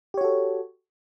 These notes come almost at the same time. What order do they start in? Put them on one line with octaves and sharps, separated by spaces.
G4 C#5 F#4 A4